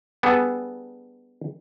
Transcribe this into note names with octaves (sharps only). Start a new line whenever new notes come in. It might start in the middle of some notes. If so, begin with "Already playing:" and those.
G3 B3 D4 G#4 A4